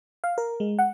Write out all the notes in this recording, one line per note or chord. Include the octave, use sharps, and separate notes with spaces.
F5
A#4
G#3
F#5